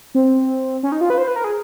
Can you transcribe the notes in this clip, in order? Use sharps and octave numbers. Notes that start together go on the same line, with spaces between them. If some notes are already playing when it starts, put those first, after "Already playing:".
C4
C#4
D#4
F4
B4
C5
B4
A#4
G#4